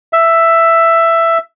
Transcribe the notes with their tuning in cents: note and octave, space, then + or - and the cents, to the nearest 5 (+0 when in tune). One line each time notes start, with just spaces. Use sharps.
E5 +10